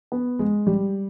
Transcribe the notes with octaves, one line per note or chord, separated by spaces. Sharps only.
B3
G#3
G3